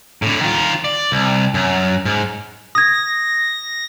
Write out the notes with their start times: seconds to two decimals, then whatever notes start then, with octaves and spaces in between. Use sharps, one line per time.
0.22 A2 D3
0.41 D#3 F4
0.84 D5
1.12 C2
1.54 F#2
2.05 G#2
2.75 D#6 G#6 A#6